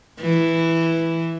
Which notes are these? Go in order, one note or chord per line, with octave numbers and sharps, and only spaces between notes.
E3